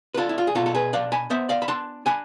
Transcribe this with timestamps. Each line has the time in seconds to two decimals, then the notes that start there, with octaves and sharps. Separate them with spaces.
0.14 B4
0.17 D4 F4 A4
0.29 E4
0.38 F4
0.47 G#4
0.55 B2 F4 A4
0.66 A4
0.74 G#4 B4
0.93 D4 D5 F5
1.12 G#5 B5
1.30 B3 C5 E5
1.49 D5 F5
1.62 B5
1.68 D4 A5 C6
2.06 D4 G#5 B5